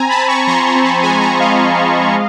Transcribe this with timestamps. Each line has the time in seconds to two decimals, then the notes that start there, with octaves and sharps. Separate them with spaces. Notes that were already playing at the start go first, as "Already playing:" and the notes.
Already playing: C4 G#5 A#5
0.09 A5 B5
0.18 C4
0.28 B5 C#6
0.47 F3 A#5 C6
0.66 A#5 C6
0.75 C4
0.84 A5 B5
1.02 G#3 G#5 A#5
1.21 G#5 A#5
1.31 F3
1.39 D#5 F5
1.58 F3
1.86 C4
2.14 G#3